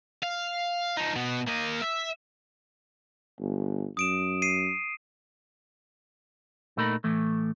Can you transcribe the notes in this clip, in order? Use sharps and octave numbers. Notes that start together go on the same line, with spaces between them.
F5
F3 D#4
B2 B3
A#3 D#5
E5
G1
F#2 D#6 D7 E7
C7 D#7
A#2 A3 D#4 A#4 B5
A2 E3 A3